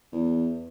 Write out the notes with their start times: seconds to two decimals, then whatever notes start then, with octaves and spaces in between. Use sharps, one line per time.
0.12 E2